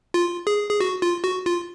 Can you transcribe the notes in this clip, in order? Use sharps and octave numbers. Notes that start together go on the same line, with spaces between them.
F4
G#4
G#4
F#4
F4
F#4
F4